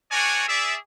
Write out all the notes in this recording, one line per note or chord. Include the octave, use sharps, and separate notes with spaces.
D4 F#4 A#4 C#5 D5 G#5
G#4 D5 E5